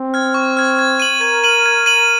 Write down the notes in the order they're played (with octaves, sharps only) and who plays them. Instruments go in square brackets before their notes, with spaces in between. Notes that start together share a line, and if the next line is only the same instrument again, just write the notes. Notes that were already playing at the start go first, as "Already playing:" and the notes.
Already playing: [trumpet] C4
[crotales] F6 G#6
C#6
F6 G#6
G#6
D#7 F#7
[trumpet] A#4 [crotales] G#6
[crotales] D#7 F#7
G#6
D#7 F#7